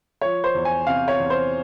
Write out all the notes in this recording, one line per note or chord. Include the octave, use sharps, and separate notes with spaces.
F3 C#5
C5
E2
G#5
C3 F5
C#5
E2
C5